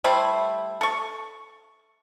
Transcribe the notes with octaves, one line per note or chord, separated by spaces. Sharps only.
G3 A3 E4 C5
A4 C#6